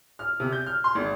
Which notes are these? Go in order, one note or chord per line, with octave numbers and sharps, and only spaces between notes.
F6
C3
G6
F6
C6
G#1